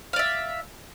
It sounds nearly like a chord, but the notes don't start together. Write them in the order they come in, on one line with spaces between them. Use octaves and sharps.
F5 D5 E5